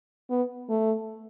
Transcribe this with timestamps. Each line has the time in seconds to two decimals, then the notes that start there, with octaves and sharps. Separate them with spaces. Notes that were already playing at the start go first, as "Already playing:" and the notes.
0.30 B3
0.70 A3